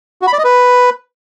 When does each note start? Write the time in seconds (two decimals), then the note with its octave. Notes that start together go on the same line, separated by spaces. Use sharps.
0.22 F#4
0.27 B5
0.33 D5
0.39 D#5
0.44 B4